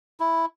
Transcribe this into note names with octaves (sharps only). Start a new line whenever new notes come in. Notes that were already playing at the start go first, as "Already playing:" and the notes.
E4